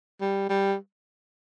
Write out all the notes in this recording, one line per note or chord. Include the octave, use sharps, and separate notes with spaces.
G3
G3